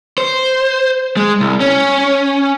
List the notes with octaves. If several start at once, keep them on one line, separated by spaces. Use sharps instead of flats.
C5
G#3
C2
C#4